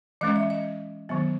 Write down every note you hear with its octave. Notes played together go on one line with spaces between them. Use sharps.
E3 G#3 C#4 D#5
E5
D#5
D#3 F#3 B3